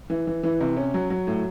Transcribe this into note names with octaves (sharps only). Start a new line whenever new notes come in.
E3
E3
E3
C3
C#4
F#3
F#3
A2